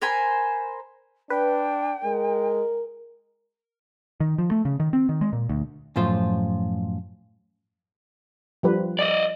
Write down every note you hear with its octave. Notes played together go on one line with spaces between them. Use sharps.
A#4 C5 G#5 B5
D4 B4 G5
G#3 A#4
D#3
F3
A3
C#3
D#3
C4
D#3
G#3
A#2
D2
F#2 A2 F3 F4 C5
F3 G3 B4
D5 D#5